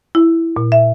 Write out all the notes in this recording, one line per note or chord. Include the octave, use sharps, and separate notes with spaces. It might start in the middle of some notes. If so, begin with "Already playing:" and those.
E4
A#2
E5